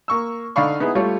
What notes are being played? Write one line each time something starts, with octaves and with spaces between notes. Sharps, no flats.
A#3 C#6 E6
D3 D#4 D5 F5 B5 C#6
B3 D#4 E4 G#4
G3 A3 F4 C#5